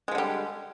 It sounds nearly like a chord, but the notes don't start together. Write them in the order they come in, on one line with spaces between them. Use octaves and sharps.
G#3 F3 D3 G3